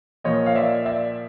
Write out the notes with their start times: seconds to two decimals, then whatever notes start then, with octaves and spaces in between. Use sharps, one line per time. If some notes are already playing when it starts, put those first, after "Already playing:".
0.24 A#2 F3 A#3 C#5 D#5
0.46 F5
0.55 D5 E5
0.86 D5 E5